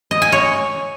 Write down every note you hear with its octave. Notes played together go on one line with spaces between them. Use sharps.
D#5
G#5
C#5